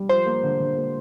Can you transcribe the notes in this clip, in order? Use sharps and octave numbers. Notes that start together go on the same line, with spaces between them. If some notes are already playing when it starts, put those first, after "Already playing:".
Already playing: G3
F3 C5
A#3
D3
D3
A#3